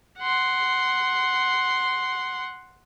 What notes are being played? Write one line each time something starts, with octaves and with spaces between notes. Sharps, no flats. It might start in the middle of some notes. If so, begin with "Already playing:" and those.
F#5 C6